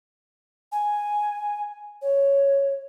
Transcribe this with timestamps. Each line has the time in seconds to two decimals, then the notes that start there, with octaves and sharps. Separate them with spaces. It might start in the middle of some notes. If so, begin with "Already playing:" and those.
0.72 G#5
2.02 C#5